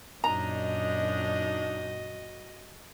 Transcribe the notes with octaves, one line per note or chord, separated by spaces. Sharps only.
F#2 A#2 D4 D#4 F#4 D#5 A#5